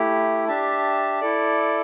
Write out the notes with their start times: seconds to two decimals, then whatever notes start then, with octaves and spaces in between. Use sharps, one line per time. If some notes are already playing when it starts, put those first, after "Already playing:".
Already playing: A3 E4 G4
0.48 D4 G4 E5 A5
1.20 E4 A4 D5